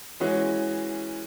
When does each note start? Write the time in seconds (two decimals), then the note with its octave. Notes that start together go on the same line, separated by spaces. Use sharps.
0.20 E3 G#3 C#4 F#4